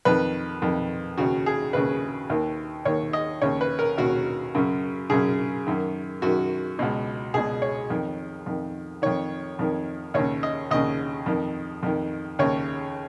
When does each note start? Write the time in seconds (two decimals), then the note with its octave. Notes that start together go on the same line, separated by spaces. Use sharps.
0.05 F2 D#3 B4
0.62 F2 D#3
1.18 D#2 C#3 F#4
1.46 G#4
1.73 D#2 C#3 B4
2.30 D#2 D#3
2.85 D#2 D#3 C#5
3.13 D#5
3.41 D#2 C#3 C#5
3.61 B4
3.79 A#4
3.97 D#2 C#3 F#4
4.55 F#2 C#3
5.10 F#2 C#3 G#4
5.67 F#2 D#3
6.22 F#2 D#3 F#4
6.79 C#2 B2
7.34 C#2 B2 G#4
7.62 C#5
7.90 F2 D#3
8.46 F2 D#3
9.02 F2 D#3 C#5
9.59 F2 D#3
10.14 D#2 C#3 C#5
10.43 D#5
10.71 D#2 C#3 D#5
11.26 F2 D#3
11.83 F2 D#3
12.39 D#2 C#3 C#5